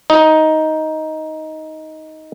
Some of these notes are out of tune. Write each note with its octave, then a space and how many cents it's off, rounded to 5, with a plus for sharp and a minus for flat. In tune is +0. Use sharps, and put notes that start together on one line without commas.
D#4 +10